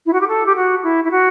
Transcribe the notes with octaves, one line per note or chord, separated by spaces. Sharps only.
E4
F#4
G4
A4
G4
F#4
E4
E4
F#4